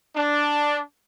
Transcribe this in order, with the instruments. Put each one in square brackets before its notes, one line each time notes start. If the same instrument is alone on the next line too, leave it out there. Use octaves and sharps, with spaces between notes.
[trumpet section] D4